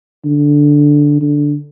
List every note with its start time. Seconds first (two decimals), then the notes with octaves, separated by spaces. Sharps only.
0.25 D3
1.21 D3